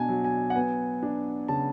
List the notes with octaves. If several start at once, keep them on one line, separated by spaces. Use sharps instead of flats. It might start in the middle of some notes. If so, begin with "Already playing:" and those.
Already playing: B2 D4 G#5 A5
F#3
G#5
F#5
B3 G#5
D4
C#3 A5